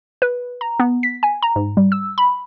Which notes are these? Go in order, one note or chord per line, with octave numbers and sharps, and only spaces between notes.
B4
A#5
B3
B6
G#5
A#5
G#2
G3
E6
B5